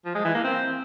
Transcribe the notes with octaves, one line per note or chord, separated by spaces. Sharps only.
F3
G#3
E3
A#3
C4